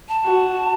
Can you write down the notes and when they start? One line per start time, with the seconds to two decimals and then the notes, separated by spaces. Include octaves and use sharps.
0.09 A5
0.24 F#4